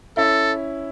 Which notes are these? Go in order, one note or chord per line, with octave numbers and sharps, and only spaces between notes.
C#4 E4 A4